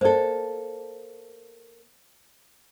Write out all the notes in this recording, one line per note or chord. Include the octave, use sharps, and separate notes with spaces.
A#3 A4 C5 D5